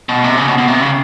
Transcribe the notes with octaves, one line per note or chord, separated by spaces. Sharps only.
B2
C3
C#3
B2
B2
C3
C#3